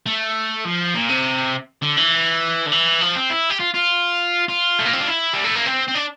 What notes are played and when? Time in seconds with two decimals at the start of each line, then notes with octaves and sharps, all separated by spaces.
0.06 A3
0.65 F3
0.95 A#2
1.09 C3
1.83 D3
1.98 E3
2.67 D3
2.72 E3
3.01 F3
3.16 C4
3.30 E4
3.50 G4
3.60 F4
3.74 F4
4.48 F4
4.79 A3
4.85 A#3
4.93 C4
5.00 D4
5.07 E4
5.33 G3
5.44 A3
5.55 A#3
5.66 C4
5.88 C4
5.95 D4